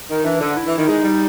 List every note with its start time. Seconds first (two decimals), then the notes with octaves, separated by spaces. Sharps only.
0.09 D#3 D#4
0.24 E3 D4
0.40 D3
0.57 E4
0.67 E3
0.77 D#3
0.87 G#3 D#4
1.04 G3